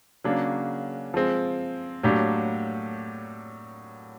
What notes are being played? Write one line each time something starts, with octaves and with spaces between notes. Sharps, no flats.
C#3 F#3 A#3 D4
F3 G#3 C4
A2 F#3 A#3 D4 G4